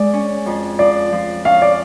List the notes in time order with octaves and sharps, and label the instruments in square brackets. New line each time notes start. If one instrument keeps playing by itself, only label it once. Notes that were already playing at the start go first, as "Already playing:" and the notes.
Already playing: [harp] G#3 [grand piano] D5
[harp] C#4
F2
[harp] F3 [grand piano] D5
[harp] F3
[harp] C#4 [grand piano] F5
[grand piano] D5